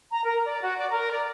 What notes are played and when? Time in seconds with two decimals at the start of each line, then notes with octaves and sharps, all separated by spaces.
0.11 A#5
0.25 A#4
0.44 D5
0.61 F#4
0.77 D5
0.90 A#4
1.11 D5